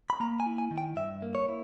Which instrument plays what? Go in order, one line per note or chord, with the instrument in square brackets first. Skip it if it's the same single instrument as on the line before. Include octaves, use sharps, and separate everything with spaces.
[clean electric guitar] B5
A#3 A#5
G#5
E4
G#5
D#3
G5
G2 E5
A#3
C#5
E4